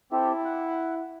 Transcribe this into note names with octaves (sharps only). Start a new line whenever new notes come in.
C4 E4 G4 A4
F#5